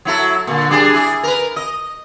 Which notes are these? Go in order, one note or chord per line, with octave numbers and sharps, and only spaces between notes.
F#3 E4 A4
A#2 D3
G3 D4 G#4
E4 G#4
A#4 B4
D#5